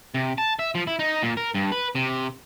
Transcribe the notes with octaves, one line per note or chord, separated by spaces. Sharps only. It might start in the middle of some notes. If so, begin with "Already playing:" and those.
C3
A5
E5
F3
E4
D#4
A#2
A#4
G2
B4
C3